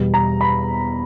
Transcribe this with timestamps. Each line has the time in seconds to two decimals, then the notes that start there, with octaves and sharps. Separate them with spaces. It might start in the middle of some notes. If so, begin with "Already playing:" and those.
Already playing: E2 B2 G3
0.14 A#5
0.41 B5